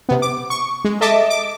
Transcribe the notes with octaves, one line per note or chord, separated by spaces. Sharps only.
C3 B3
D6
C#6
G#3
A4 D#5 E5 A5 D6
D6